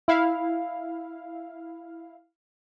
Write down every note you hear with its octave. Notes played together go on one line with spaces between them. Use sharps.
E4 F5